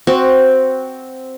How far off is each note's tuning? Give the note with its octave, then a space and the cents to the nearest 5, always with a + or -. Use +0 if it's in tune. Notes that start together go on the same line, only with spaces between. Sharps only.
C4 +0 F#4 +0